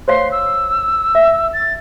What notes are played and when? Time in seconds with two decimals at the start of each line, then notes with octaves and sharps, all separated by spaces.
0.08 C5 C#5 F5 C6
0.31 E6
1.15 E5
1.53 A6